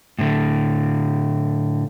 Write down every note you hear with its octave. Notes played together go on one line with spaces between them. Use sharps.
A2 D3